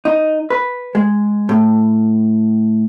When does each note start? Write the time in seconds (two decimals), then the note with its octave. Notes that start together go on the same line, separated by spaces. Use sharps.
0.05 D#4
0.50 B4
0.95 G#3
1.49 A2